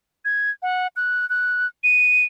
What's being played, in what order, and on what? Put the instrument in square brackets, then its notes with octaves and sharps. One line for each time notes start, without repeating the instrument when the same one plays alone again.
[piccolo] G#6
F#5
F#6
F#6
D#7